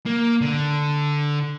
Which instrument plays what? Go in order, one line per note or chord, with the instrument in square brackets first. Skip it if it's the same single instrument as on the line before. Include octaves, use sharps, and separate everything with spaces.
[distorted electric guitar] A#3
D3